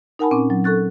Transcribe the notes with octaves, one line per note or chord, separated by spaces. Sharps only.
D#4 A#4 F#5 G#5 A5 B5
A#2 C4 C#4 G#5 D6
F#3
A4 C#6 F#6 A6